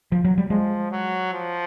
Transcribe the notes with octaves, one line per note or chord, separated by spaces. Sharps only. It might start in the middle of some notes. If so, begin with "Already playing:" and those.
F3
F#3
G3
F3 G#3
F#3
F3